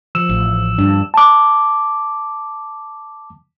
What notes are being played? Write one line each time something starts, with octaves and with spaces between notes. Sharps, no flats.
F3 E6 E7
A1
G2 D4
A5 D6